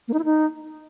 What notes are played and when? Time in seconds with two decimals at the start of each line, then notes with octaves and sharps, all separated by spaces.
0.08 A#3
0.14 D#4
0.19 E4
0.25 D#4